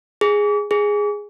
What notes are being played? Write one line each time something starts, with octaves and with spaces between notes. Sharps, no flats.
G#4
G#4